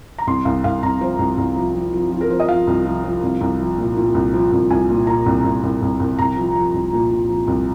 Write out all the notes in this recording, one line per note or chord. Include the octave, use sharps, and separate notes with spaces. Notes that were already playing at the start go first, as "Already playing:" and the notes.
A#5
C2 C6
C2 F5
C2 F5
C2 A#5
F3 C5
C2
C2
F3
F3
F3
F3
A#4
F3 C5
D#5
F3 F5
C2
F3
F3
C2
C2
F3
A#2
A#2
C2
F3
C2
C2 G#5
A#2
A#2 A#5
C2
C2
C2
C2
C2
C2 A#5
F3
F3
C2
A#2
A#2
F3
C2